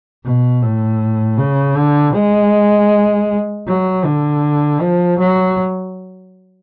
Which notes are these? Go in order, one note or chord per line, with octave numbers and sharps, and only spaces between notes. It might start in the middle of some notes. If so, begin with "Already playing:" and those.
B2
A2
C#3
D3
G#3
F#3
D3
F3
F#3